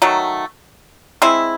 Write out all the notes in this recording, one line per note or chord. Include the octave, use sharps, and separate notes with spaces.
D#3 F#3 A3
G#3 C4 E4